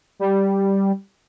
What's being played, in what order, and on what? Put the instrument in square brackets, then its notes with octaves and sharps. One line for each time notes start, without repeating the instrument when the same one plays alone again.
[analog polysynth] G3